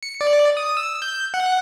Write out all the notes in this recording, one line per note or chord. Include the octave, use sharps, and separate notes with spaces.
C#7
D5
D#6
E6
G6
F#5